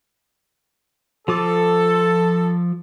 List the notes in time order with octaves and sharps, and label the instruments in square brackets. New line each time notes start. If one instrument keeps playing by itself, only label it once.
[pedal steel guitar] F3 F4 D6 [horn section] A4